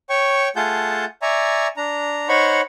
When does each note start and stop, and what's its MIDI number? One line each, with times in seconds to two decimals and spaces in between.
0.10 0.49 73
0.10 0.49 79
0.10 0.49 85
0.56 1.05 57
0.56 1.05 65
0.56 1.05 68
0.56 1.05 78
0.56 1.05 81
0.56 1.05 91
1.22 1.68 74
1.22 1.68 76
1.22 1.68 80
1.22 1.68 82
1.22 1.68 85
1.77 2.28 62
1.77 2.28 82
2.29 2.61 63
2.29 2.61 72
2.29 2.61 73
2.29 2.61 78
2.29 2.61 83
2.29 2.61 85